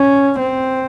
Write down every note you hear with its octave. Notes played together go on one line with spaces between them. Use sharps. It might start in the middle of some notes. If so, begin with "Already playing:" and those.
Already playing: C#4
C4